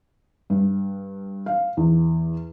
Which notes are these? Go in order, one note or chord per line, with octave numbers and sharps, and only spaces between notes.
G2
F5
E2